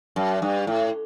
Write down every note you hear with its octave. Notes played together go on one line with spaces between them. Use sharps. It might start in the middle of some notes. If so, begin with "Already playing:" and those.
F#2
G2
A2